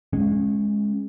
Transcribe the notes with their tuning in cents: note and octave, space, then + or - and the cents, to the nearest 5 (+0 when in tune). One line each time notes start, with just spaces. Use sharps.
G#3 +0 C#4 -25